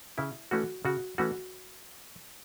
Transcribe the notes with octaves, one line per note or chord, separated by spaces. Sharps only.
C#3 E4
E3 A3 C#4 F#4
C#3 F#4
E3 A3 C#4 F#4